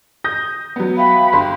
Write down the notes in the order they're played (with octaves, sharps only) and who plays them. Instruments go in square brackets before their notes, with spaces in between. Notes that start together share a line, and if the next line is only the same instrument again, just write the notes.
[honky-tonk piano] D#6 G6 A#6
F#3 B3
[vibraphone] E5 F5 G5 [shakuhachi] B5
[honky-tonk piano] G1 [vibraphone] C6